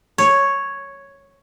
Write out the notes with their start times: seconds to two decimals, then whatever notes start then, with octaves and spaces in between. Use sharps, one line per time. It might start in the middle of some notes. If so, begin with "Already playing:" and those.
0.18 C#5